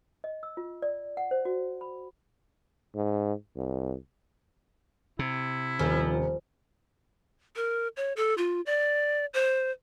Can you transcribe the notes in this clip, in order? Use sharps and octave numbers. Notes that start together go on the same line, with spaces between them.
D#5
E6
F4
D5
F#5
C5
F#4
B5
G#2
C2
C3 E4
D#1 F3
A#4
C#5
A4
F4
D5
C5